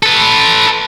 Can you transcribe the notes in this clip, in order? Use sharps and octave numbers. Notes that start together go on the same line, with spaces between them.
A4 B4